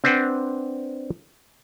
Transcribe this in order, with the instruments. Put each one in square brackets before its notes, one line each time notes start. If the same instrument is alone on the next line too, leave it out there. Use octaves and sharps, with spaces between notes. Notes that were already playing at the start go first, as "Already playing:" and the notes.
[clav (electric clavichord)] C4 D4 B4 C5 F#5 G5